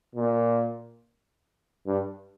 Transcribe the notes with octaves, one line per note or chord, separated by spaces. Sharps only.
A#2
G2